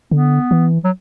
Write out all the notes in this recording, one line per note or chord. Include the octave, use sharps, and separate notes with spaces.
D3 B3
E3
F#3